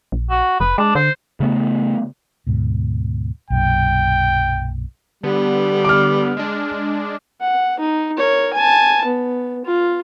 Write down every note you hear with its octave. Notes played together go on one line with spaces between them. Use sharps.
A#1
F#4
F1 B4
G#3 D4
D3 C5
C#3 A3 B3
D2 G#2 B2
B1 F#2 A#2 G5
D3 G3 B3
D6 F6
G#3 D4
F#5
D#4
A#4 C#5
G#5 A5
B3
F4